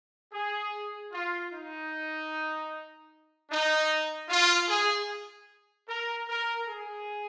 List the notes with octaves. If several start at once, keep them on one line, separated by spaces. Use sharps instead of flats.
G#4
F4
D#4
D#4
F4
G#4
A#4
A#4
G#4